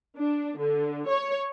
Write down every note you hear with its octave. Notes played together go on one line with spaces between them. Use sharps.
D4
D3
C#5